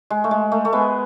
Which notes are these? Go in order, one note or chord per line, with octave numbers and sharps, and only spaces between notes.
G#3
A3
G#3
A3
A3
G#3 B3